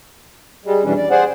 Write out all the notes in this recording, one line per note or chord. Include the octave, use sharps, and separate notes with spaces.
G3 G#3
F2 B2 E3 G3 C#4 D4
D5
G#4 C5 D5 F#5